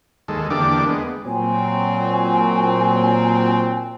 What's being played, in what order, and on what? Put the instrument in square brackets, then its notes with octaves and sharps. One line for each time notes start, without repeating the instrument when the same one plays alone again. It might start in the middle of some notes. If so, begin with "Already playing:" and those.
[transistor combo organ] D#2 G#3 A4
E2 D3 A#3 D4 G4 D6
G#3 B3
[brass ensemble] A#2 F#3 C4 [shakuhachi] G#5